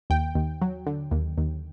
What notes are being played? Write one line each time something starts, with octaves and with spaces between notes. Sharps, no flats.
D#2 G5
D#2
F#3
D3
D#2
D#2